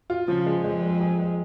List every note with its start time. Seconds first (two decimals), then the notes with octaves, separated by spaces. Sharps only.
0.10 F4
0.28 C#3 F3
0.46 G#3
0.64 F2 G#3
0.82 G#3
1.01 G#4
1.19 G#3